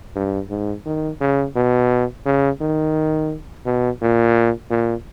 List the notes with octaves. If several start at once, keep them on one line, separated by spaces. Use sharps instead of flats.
G2
G#2
D#3
C#3
B2
C#3
D#3
B2
A#2
A#2